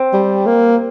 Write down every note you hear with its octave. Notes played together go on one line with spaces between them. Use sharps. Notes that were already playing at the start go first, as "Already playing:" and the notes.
Already playing: C4
G3
A#3